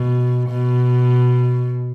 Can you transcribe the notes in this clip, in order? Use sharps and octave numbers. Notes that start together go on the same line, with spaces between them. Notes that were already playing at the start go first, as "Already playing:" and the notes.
Already playing: B2
B2